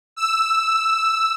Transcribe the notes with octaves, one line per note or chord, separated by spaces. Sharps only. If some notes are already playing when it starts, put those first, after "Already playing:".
E6